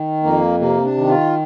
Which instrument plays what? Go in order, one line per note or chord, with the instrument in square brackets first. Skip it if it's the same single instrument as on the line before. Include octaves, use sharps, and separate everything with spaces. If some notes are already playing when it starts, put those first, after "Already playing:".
Already playing: [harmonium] D#3
F2 A#3
C3 A#3
D4
D#3
F4